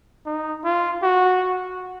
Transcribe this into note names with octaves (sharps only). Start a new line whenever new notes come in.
D#4
F4
F#4